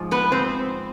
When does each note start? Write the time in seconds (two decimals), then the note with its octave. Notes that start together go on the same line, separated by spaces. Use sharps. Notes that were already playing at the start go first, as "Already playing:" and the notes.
Already playing: G#2 F3
0.11 B3 B4
0.32 C4 C5